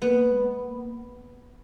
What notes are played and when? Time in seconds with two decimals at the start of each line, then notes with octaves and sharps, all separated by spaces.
0.02 A#3 B3
0.32 G#3
0.60 A#3